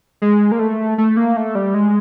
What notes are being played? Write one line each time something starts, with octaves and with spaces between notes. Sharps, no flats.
G#3
A#3
A3
A3
A#3
A3
G3
G#3